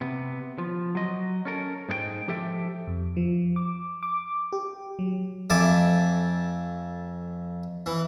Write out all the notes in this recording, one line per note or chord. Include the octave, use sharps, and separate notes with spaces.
C3 B3
F3
F#3 D#5
C#4 A4 A#4
G#2 D#4 A#4 G5
F3 G4 A4 E5 G5
F2
F3
D6
D6
G4
F#3
F2 A3 G#5 A5 D6
E3